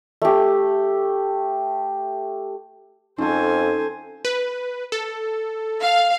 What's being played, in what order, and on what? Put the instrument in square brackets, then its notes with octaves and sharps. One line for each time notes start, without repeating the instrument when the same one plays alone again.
[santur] A3 G4
[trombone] F2 [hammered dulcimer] C#4 A4 [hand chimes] D#4 [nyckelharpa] C5 G#5
[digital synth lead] B4
A4
[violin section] F5